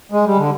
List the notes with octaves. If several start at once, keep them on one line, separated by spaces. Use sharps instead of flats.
G#3
G3
D3